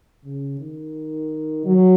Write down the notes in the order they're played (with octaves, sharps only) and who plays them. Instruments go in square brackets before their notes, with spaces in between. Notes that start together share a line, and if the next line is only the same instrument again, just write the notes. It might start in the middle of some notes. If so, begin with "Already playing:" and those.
[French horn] C#3
D#3
F#3